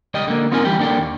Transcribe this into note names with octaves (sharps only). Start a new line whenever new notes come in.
C#2 G3 D5 D#5 G5
D3 A#3
B3 C4 D#4 F4 A#4 G#5
D2 E3 G3 G4 G5
A#3 D4 A4 D5 G5
D#2